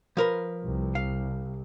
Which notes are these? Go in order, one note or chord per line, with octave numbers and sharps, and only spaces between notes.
F3 A#4 B4
C2
F5